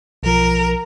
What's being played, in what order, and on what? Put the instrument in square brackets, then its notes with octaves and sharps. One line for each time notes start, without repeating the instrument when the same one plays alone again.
[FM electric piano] B1 F3 [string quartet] A#4